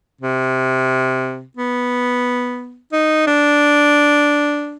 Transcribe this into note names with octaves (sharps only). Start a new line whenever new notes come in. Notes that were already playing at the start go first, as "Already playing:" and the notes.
C3
B3
D#4
D4